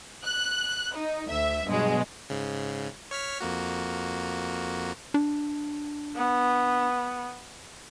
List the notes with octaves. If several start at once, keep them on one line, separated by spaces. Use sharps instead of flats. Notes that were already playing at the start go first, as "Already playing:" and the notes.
F#6
D#4
D2 E5
G2 B2 F#3 G#3
G#2 C#3
C#5 F6 B6
F2 A#3 F#4
D4
B3